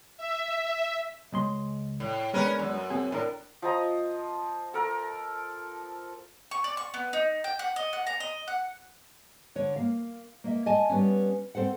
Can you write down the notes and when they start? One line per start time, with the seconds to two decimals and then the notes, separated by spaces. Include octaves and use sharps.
0.17 E5
0.68 E5
1.32 C#2 G#3 C6
2.00 A2
2.34 G#3 B3 C#4 D4 A#4 B4
2.59 F#2
2.90 C4 G#4
3.12 A2 D4 A#4
3.62 F3 D#5 A#5
4.74 A4 A#4
6.51 C#6
6.64 D5
6.77 C#6
6.94 B3
7.13 D#4
7.44 G5
7.59 F#5
7.76 D#5
7.93 F#5
8.07 A#5
8.20 D#5
8.48 F#5
9.56 D3 C#5
9.76 A#3 F5
10.44 A#3 D#5 E5
10.66 D#5 G#5 A5
10.90 G3 B3 C#4
11.55 C4 A4 C5 F#5